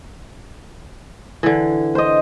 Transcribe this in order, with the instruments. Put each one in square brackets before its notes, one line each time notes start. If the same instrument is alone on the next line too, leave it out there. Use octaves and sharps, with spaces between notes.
[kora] D3 E3
[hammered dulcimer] C5 D#5